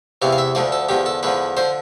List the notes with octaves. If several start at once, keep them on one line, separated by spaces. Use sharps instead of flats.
E2 C3 E3 F5
F5
E5
D2 D3 F3 D5
A4
E2 D3 F3 G4
A4
E2 D3 F3 B4
D3 F3 C5